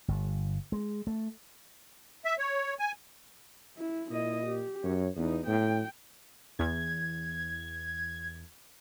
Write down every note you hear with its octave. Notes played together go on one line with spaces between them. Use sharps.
G1
G#3
A3
E5
C#5
G#5
E4
A#2 E4 D#5
G4
F#2 C#5
E2 B3 D#4
A2 G5
E2 G#6